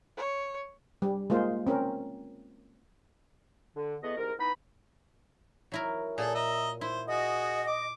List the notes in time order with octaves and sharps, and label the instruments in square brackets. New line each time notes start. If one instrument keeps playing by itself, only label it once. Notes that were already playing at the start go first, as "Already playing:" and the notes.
[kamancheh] C#5
[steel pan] G3
G#3 A#3 F4 C5
C4 C#4 A#4
[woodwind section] D3
E2 A3 B3 D#5
C2 G#2 A#4
E3 B3 D#4 B5
[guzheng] F#3 E4 A#4
[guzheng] A#2 [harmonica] G#4 A4
[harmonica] D#5 E5 A#5
[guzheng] E4 [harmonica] C5
[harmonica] F#4 G#4 [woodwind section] D#5
[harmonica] D6